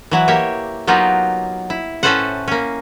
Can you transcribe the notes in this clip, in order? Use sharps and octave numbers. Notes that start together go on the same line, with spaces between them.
E3 F#3 E4
A#3 G4 C#5 E5
F#3 A#3 B3 D#4 F4 G4
E4
A2 C#4 A4 B4 C5 F#5
A#3 C#4